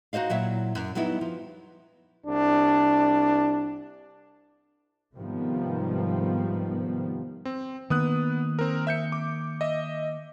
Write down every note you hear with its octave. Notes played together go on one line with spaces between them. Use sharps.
D#4 F#4 C5 D#5 F5
A#2 F#3 E4 E5
F#2
F#3 G3 B3 D#4 E4
F3
C2 D4
G#2 C3 D#3 F3 G3 B3
C4
D#3 A#3 B3 D#6 F#6
C4 A#4
E5 G6 C#7
D6
D#5 E5